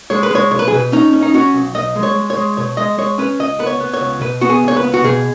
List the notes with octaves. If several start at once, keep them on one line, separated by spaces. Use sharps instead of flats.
G#3 C#5
B4
G#3 C#5
B1 C#5
B4
G#4
B2 B4
C#4 D#4
C#4
D#4
C#4 F#4
B1
B1 D#5
G#3
C#5
G#3
C#5
G#3
B2 C#5
G#3 D#5
G#3 C#5
C#4 B4
C#2 D#5
B3 B4
C#5
B3
C#5
C#2
B2 B4
B3 F#4
G#4
C#2 C#5
B4
B3
F#4
B2 G#4